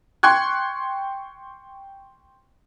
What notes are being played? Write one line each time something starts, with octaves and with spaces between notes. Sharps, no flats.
G5 C6 C#6 F#6 G#6